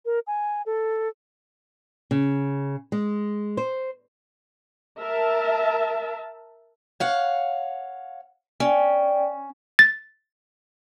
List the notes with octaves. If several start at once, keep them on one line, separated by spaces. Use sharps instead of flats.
A#4
G#5
A4
C#3
G#3
C5
A#4 E5 A5
C#5 F5 F#5
C#4 D5 G5
A6